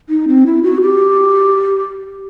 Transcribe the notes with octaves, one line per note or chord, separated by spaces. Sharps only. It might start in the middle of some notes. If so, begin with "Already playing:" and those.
D#4
C4
E4
F#4
G4